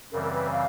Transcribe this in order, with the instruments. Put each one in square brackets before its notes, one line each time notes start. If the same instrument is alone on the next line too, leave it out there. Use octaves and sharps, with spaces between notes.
[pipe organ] F#2 C#3 E3 G3 C4 [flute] A#4
[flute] A#4
B4
F5